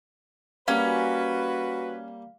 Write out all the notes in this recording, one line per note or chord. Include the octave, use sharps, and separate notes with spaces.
G3 A#3 C#4 F#4 B4 F5